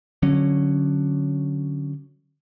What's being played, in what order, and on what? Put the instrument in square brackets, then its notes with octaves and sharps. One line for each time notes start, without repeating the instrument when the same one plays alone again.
[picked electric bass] D3 F#3 C#4